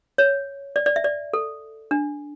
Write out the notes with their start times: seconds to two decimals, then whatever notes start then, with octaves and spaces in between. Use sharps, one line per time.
0.18 C#5
0.76 D5
0.86 D5
0.96 E5
1.04 D5
1.33 A4
1.91 D4